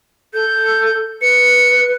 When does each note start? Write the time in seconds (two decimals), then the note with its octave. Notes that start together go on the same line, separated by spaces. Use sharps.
0.34 A4 G6
1.22 B4 C#7